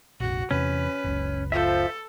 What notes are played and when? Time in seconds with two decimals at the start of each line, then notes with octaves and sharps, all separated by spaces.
0.20 F1 A#1 F#4
0.51 E2 C3 C#4 B4
1.04 F#1 C#2
1.52 F3 A4 C5 E5